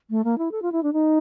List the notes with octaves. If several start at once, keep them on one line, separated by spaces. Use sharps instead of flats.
A3
A#3
E4
A4
F4
E4
D4
D#4